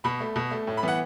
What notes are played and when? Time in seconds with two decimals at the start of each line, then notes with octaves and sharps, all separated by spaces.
0.04 B2 B5
0.20 A3
0.36 B2
0.51 A3
0.67 A2
0.77 B5
0.83 E3 B3 F#5